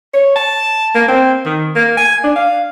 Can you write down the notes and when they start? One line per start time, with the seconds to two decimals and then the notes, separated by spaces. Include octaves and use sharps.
0.14 C#5
0.36 A5
0.95 A#3
1.08 C4
1.46 D#3
1.75 A#3
1.97 G#5
2.24 D4
2.36 F5